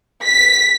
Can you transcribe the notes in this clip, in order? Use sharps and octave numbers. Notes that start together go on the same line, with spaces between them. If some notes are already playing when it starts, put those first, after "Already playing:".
B6